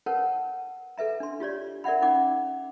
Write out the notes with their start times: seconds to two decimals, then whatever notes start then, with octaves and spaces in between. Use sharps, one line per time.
0.06 A#4 B4 C#5 F#5 A5
0.98 A4 B4 E5 A#5
1.20 D4 C6
1.40 F4 G4 C#5 D5
1.84 A#4 D5 E5 F#5 B5
2.02 C#4 D#4 F#5 D6